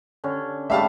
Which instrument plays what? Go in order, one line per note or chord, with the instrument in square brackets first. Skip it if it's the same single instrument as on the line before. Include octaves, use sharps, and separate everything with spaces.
[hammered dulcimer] D3 C#4
[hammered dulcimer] G#2 G3 A3 [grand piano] E5 F5 A5